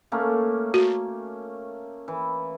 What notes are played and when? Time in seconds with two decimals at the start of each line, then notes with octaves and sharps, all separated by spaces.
0.12 A3 A#3 C#4
0.74 F#4
2.08 E3